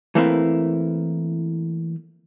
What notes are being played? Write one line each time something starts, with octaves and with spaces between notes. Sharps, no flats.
E3 A3 A#3 C4 E4 B4